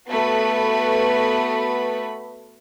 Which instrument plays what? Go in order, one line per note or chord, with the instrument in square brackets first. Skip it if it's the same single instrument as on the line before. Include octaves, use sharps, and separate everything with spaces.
[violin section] A3 B3 F#4 B4 B5